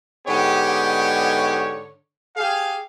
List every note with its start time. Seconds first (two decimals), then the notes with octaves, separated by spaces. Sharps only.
0.27 G#2 D3 G#3 B3 G4 C#5
2.37 G4 G#4 F5